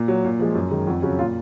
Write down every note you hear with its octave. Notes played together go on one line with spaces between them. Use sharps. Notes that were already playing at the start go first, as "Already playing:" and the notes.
Already playing: A#2
F#3
A#2
F3 G#3
F#2
D#3 G#3
F2 F#4
C#3 F#3 C#4
A#2 F4